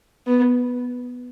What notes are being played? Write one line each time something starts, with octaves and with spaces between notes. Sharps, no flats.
B3